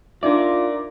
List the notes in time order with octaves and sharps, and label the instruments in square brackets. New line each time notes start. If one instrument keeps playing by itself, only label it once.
[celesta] D4 D#4 E5 [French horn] F4 [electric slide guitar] A#4 D5